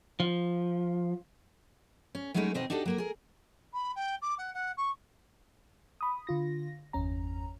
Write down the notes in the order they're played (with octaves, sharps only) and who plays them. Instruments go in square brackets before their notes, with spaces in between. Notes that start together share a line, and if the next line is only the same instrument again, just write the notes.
[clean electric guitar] F3
[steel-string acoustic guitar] C#4
F#3 G#3 A3 C#4 D#4 E4
D#2 B2 C4 D#4 D#5
D4 D#4 F#4 G4 A4
F#3 A#3 A#4
G#4 A#4
[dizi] B5
G5
D6
F#5
F#5
C#6
[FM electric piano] B5 D#6
D3 F4 A#6
G1 E2 C#4 A#5